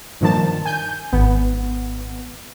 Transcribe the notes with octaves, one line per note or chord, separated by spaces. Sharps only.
G2 A#2 D#3 F3 A5
G#5 G6
G#1 B3